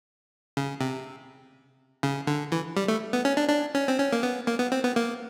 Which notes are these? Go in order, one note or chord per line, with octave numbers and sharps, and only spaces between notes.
C#3
C3
C#3
D3
E3
G3
A3
B3
C#4
D4
D4
C#4
C4
C#4
A#3
B3
A#3
B3
C4
B3
A#3